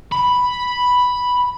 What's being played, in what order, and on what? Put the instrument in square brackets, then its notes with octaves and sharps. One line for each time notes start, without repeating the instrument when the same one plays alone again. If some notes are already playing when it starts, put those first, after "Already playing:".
[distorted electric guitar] B5